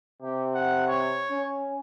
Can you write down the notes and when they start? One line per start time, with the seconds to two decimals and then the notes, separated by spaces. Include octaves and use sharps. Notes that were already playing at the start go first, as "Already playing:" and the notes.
0.22 C3 G4
0.54 F#5
0.88 C#5
1.30 C#4